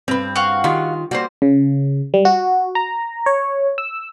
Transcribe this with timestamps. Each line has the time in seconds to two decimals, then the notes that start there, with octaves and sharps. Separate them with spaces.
0.08 G2 C4 B4
0.36 F#4 F5 G5 C#6
0.64 D#3 F4 G4
1.11 G3 A#3 F#4 C5
1.42 C#3
2.14 G3
2.25 F#4
2.75 A#5
3.26 C#5
3.78 E6